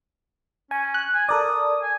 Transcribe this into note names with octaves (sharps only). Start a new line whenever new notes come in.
C#4 G#5
F#6
G#5
A4 A#4 D5 D#6
G#5